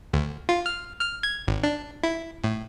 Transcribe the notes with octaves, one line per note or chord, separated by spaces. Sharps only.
D2
F4
F6
F6
G#6
G#1
D4
E4
A2